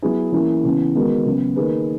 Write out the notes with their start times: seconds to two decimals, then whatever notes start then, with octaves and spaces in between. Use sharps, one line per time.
0.02 F#3 B3 E4 G#4
0.32 E3 A#3 C#4 E4
0.63 C#3 E3 B3
0.95 D#3 G#3 B3 F#4 A#4
1.25 C#3 F#3 B3
1.56 D#3 A#3 D#4 G#4 B4